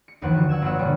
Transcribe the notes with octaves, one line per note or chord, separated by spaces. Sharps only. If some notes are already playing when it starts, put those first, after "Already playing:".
C#7
G1 D#2 E3 F3 F#5
D3 F3 F#4
F#5 E6 G#6 E7
G1 F#3 A#3 C#5 F#5 E6
A#2 D3 G3